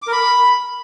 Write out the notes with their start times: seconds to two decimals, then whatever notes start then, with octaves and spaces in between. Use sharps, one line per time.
0.02 D6
0.07 A#4
0.12 B5